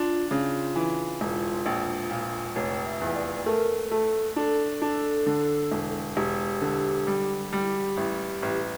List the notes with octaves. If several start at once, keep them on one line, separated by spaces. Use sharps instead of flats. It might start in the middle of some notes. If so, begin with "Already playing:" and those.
Already playing: D4 F4
C#3 F4
E3
E1
A#1
A#2
F1 C#5
E5
E2
D5
A3 A#4
A3 A4
D4
D4
D3
E1
E1 G4
D3
G3
G3
A1
A1